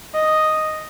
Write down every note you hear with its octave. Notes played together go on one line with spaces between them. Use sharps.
D#5